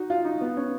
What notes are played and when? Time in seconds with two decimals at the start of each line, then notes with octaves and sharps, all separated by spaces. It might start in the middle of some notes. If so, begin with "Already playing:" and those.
Already playing: D#4 F#4
0.10 F4
0.25 D#4
0.41 B3
0.57 C#4